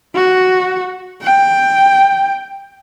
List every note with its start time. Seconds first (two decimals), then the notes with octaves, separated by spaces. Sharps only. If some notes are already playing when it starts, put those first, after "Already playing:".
0.15 F#4
1.22 G5